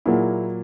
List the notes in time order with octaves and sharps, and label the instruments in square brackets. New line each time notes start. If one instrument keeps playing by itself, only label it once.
[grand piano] A#2 F#3 A#3 E4 G#4